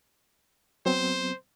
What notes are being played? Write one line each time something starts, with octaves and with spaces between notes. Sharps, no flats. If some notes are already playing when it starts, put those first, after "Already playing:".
F#3 B3 C4 C5